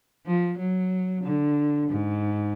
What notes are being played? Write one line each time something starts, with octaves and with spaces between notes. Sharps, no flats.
F3
F#3
D3
G#2